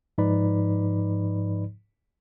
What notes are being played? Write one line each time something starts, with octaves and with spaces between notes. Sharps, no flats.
G#2 F3 D#4 B4 D5 B5